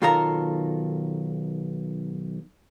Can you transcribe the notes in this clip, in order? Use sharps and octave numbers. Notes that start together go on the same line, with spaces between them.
B1 D#3 F4 A4 A#4 A#5